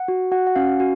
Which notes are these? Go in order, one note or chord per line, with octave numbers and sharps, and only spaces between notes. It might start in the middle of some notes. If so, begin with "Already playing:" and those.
Already playing: F#5
F#4
F#4 F#5
F#5
C#4 F5
F#4